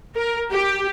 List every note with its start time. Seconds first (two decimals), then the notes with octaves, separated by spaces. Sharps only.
0.16 A#4
0.52 G4